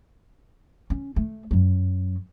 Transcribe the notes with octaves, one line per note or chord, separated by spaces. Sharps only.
C#4
A3
F#2 F#3